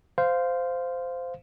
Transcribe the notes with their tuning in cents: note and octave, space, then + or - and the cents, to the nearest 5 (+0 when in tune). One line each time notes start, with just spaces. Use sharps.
C5 -15 F5 +0